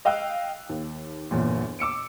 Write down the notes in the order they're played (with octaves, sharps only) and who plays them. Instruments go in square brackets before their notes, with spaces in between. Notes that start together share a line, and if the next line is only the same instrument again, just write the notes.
[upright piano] D#5 F5 G5 E6 F#6
D#2
G1 E2 A#2
D6 E6 C#7 D7